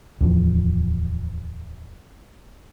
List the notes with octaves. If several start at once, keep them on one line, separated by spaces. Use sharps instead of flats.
D1 E2 F3